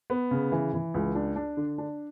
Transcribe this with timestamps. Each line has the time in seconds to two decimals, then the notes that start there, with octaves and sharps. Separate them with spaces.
0.10 B3
0.31 C#3
0.52 E3
0.74 E3
0.94 C#2
1.15 D4
1.36 D4
1.57 D3
1.78 D4